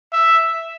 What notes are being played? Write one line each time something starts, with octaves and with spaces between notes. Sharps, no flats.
E5